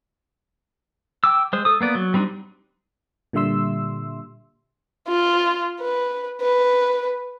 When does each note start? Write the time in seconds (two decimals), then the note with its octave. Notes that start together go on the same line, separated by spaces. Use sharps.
1.24 G5 D6 E6
1.53 G#3 C5
1.65 A4 D#6
1.81 A#3 B3 D5
1.95 F#3
2.14 G3 C4 D4 D#4
3.33 A#2 D3 G3 E5 C6 E6
5.08 F4
5.80 B4
6.41 B4